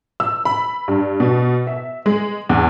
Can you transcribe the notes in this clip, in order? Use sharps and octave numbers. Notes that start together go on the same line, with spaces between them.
E6
B5
G2
B2
E5
G#3
E2